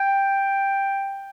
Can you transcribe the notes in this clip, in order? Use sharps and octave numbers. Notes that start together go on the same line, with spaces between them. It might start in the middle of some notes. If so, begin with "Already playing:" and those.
Already playing: G5